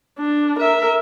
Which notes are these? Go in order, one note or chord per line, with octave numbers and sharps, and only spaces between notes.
D4
A#4 E5